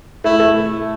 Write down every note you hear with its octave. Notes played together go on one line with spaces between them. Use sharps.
A3 E4
A3